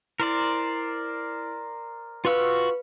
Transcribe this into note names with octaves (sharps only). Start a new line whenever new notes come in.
E4 A#4 C5 D5
F4 F#4 B4 F5 E6